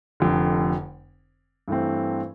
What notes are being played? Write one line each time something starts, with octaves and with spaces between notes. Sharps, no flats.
F1 F2 D3
G2 E3 A3 C4